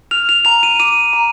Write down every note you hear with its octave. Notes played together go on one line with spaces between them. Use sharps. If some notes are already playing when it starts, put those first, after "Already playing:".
F6 F7
F7
A#5 F7
D#7
D6 D#7
A#5